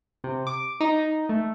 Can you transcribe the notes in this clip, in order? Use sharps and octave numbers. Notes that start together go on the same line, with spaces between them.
C3
D6
D#4
A3